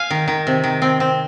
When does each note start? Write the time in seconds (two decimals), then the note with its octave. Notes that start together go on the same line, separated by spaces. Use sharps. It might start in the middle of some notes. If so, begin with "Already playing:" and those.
Already playing: F5 G#5
0.10 D#3
0.28 D#3
0.47 C3
0.64 D#3
0.82 C4
1.00 C4